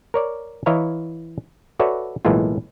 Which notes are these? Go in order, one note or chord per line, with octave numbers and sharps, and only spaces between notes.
A#4 C#5 D5
E3 E4 C#5 D#5 F5 A#5
F#4 A4 B4 C#5 D5 E5
B1 A2 E3 G#3 A#3 F4